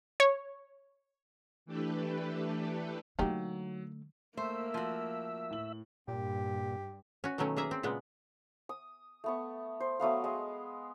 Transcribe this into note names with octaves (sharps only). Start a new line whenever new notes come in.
C#5
E3 A3 D4 G4 A4 B4
D3 F#3 A3 A#3 D#4 G4
A3 A#3 C5 E5
F3 F#4
A2 F#7
G2 A#2 G4
C#4 F#4
B2 D#3 F#3 A3 C#4
A#3 G#4 E5 A#5
C4
A#2 C#3 G#3 B3
D#6
A3 B3 C#6
C5
F#3 A3 B3 F5
G#3 D#5